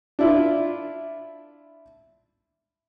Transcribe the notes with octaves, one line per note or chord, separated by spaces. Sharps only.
D4 E4 F4